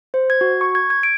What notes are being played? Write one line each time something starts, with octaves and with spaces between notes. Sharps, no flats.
C5
G#6
F#4
C#6
G#6
G#6
D7